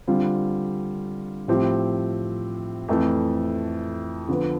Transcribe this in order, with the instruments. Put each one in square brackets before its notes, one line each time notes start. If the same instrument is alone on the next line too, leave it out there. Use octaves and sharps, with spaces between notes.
[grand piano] D3 G3 C4 F4
A2 F3 C4 G4
F2 E3 A3
D3 F3 B3